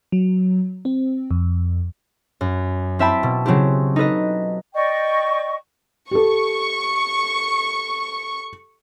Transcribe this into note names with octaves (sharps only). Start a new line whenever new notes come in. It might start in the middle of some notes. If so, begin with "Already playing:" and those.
F#3
C4
F2
F#2
C4 E4 E5 G5 A5 B5
B2
C#3 F#3 C4 E4 G4
D#4 A4 B4 D#5
D5 D#5 G5 C#6
G4 A4 C#6